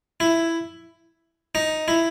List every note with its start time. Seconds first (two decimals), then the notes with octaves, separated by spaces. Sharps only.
0.20 E4
1.55 D#4
1.88 E4